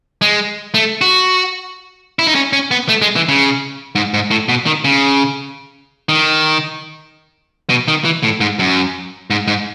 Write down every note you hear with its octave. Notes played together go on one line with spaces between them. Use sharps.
G#3
A3
F#4
E4
D#4
C#4
C#4
B3
A3
G#3
E3
C#3
G#2
G#2
A2
B2
D#3
C#3
D#3
B2
D#3
E3
A2
G#2
F#2
G#2
G#2